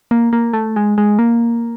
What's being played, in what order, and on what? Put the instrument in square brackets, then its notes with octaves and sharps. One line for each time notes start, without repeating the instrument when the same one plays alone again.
[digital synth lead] A#3
A#3
A3
G#3
G#3
A#3